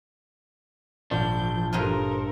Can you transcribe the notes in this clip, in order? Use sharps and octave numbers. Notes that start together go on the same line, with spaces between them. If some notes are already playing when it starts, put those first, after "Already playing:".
G#1 A#2 F3 D4 G6
G2 D#4 F4 A4 A#4 C5